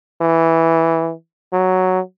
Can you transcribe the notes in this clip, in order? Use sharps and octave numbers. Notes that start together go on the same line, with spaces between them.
E3
F#3